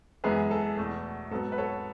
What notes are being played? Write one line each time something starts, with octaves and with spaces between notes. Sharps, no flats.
F#2 E3 G#3 B3 G#4 B4
A4
E2 B2 A3
G#2 F#3 B3 A4
B4
A4 C#5